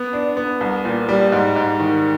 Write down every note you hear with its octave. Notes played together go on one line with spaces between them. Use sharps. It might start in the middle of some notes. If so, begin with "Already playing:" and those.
Already playing: B3
D4
B3
C2
A#2
G3
G#2
G#2
D#3